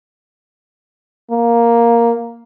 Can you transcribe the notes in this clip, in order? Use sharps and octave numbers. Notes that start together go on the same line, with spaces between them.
A#3